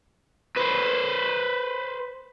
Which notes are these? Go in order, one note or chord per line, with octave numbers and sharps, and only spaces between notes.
B4 C5